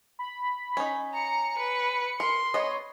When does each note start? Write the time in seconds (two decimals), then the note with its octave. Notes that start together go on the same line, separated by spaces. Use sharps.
0.19 B5
0.77 C#4 D#4
1.14 A#5 C#7
1.58 B4
2.20 A#4 C6
2.54 B3 C#5 D#5